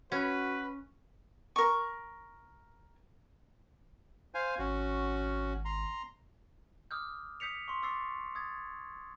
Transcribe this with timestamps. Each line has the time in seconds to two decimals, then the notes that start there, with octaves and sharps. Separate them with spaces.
0.12 C#4 F#4 B4
1.56 A#4 C#6
4.34 C5 F5 G#5
4.59 G#1 C#4 F#4
5.65 A#5 C6
6.91 D6 D#6 F6 G6
7.40 D#6 G6 B6 C#7 F7
7.68 C6 C#6
7.82 C#6 D6 E6 A6 C7
8.35 D#6 G#6 A6